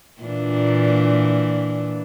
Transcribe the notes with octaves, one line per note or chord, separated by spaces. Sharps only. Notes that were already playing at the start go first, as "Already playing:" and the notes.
A#2 E3 D4